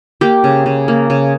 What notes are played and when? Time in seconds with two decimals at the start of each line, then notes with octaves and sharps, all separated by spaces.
0.21 A#3 G4
0.44 C#3
0.66 C#3
0.88 A#3
1.10 C#3